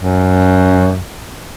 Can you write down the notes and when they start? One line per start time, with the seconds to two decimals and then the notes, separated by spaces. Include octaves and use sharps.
0.01 F#2